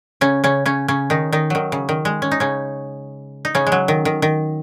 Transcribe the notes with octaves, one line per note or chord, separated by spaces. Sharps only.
C#3 C#4
C#3 C#4
C#3 C#4
C#3 C#4
D#3 D#4
D#3 D#4
D#3 F#3
C#3
D#3
G#3
C#4
D#4
C#3 C#4
D#4
C#3 C#4
G#3
F#3
D#3
D#3
D#3